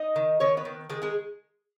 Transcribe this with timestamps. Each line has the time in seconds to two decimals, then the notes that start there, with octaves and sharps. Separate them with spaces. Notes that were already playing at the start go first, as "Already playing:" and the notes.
Already playing: D#4 D#5
0.16 D#3
0.40 D#3 C#4 C#5
0.57 B3 B4
0.65 D#3
0.90 D#3 G#3 G#4
1.02 G#3 G#4